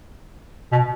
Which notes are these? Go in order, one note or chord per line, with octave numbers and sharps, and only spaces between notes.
B2